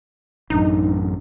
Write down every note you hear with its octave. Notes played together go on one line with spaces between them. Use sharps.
A1 F#2 D4 D#4